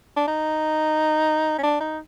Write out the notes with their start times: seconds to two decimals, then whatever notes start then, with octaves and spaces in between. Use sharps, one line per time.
0.17 D4
0.27 D#4
1.58 C#4
1.63 D4
1.80 D#4